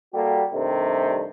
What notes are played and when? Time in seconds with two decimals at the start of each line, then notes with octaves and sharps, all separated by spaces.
0.13 G3 A#3 F#4 G4 A4
0.54 G2 C3 D#3 G3 A3